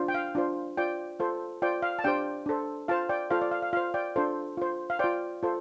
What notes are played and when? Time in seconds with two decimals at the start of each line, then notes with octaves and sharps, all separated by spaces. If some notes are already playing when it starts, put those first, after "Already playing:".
Already playing: D4 F4 C5
0.08 G5
0.14 F5
0.35 D4 F4 C5
0.77 F4 C5 D5 G5
1.20 F4 A4 C5
1.62 F4 C5 D5 G5
1.82 F5
1.99 A5
2.04 D4 G4 C5 D5 G5
2.46 D4 A4 C5
2.88 F4 C5 F5 A5
3.09 D5 G5
3.30 F4 A4 C5 F5
3.42 D5
3.51 F5
3.63 F5
3.73 F4 C5 F5
3.94 D5 G5
4.16 D4 F4 A4 C5
4.57 F4 C5
4.90 F5
4.99 F4 C5 D5 G5
5.43 F4 A4 C5